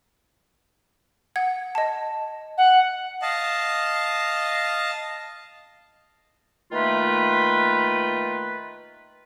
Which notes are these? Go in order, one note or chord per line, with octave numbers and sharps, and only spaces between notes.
F#5 G#6
D#5 A5
F#5
D#5 F5 A5
D#3 A3 A#3 F4 B4